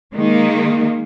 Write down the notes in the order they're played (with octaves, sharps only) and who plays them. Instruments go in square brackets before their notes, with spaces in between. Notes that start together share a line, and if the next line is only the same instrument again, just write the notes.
[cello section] D#3 G#3 A#3